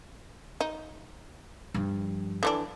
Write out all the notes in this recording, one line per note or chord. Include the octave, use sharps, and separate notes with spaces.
D#4
G2 F3
D3 E3 D4